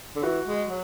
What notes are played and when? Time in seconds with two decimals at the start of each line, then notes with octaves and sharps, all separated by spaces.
0.16 D3
0.23 E3 F#4
0.46 G#3
0.69 F#3